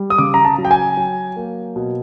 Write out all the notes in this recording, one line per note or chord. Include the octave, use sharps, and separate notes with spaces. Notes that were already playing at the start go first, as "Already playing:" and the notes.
Already playing: G3
D#6
C#3 D6
A#5
A5
F#3
G5
G#5
F#3
A#3
B2